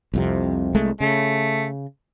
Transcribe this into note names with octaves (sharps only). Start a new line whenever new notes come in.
C2 F2 C3
C2 G#3 A3
C#3 A3